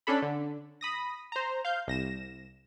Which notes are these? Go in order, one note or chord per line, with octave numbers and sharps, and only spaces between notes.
C#4 D4 A4 B5
D3
B5 D#6 A#6
C5 A#5
F5 G6
C2 A#6 E7